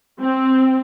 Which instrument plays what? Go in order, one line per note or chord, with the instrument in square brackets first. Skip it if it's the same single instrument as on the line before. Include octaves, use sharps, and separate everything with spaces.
[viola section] C4